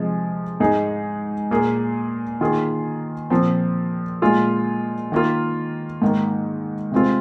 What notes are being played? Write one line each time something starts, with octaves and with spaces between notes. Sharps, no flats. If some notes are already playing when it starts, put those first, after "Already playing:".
Already playing: C3 F3 G#3 D#4 G#4
G#2 G#3 D#4 G#4
A#2 A#3 G#4
D#3 A#3 F4 G#4
A#2 F3 C4
A#2 G#3 F4 G#4
D#3 A#3 F4
G#2 D#3 A#3
C3 G#3 C4 F4